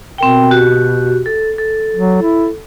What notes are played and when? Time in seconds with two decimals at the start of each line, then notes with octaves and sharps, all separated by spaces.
0.18 B2 C4 A#4 G5
0.51 F#4 G4
1.26 A4
1.58 A4
1.96 F#3
2.22 E4